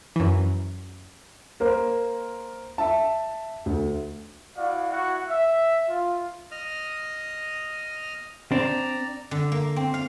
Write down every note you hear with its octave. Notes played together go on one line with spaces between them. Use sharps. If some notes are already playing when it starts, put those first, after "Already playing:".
F#2 E3
A#3 A#4 C5
E5 A5
D2
E4 F#4 D5 F5
E4 F#4 F#5
E5
F4
D#5 D#6 F6
C4 D4 D5 A#5
D3
A#3
C4
F5